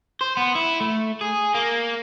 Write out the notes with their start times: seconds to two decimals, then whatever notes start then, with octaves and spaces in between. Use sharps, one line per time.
0.21 C5
0.37 B3
0.55 E4
0.81 A3
1.21 G#4
1.55 A#3